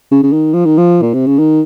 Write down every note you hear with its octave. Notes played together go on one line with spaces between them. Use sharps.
C#3
C#3
D#3
F3
D#3
F3
A#2
C3
C#3
D#3